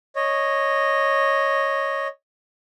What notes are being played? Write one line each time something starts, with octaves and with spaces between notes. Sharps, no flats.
C#5 D#5